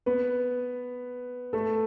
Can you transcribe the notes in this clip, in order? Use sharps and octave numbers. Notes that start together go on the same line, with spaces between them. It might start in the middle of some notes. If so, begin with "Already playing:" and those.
B3 B4
A3 A4